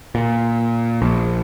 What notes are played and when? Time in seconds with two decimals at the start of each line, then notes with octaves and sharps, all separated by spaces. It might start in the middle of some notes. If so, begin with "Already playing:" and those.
0.15 A#2
1.02 A#1